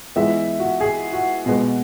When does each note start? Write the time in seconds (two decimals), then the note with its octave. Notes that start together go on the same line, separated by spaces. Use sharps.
0.16 E3 G#3 B3 E5
0.60 F#4
0.81 G#4
1.13 F#4
1.46 B2 G#3 B3